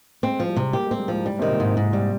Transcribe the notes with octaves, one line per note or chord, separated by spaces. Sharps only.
G#3 C4
F3
G3
C3
A#3 G4
G#3
C4
G3
G#2 F3
G#2 G3
C3 D#3
A#2
G#2
G#2 C3
G3